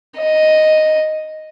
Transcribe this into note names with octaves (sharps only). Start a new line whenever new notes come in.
D#5